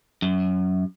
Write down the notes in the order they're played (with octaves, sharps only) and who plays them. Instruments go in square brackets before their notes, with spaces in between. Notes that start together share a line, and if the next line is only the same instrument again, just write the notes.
[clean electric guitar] F#2